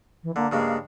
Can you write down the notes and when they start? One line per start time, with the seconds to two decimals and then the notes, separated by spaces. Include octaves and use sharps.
0.24 E3
0.36 D3 A#3
0.51 G2 C#3 G#3 A#3